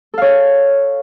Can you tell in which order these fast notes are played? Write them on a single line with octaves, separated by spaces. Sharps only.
A4 F5 C#5